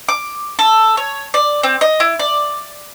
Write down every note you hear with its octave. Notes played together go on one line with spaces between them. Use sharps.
D6
A4
C#5
D5
C4
D#5
E4
D5